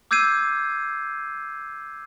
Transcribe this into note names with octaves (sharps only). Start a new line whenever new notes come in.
D6 E6 G6 G#6 C7 D#7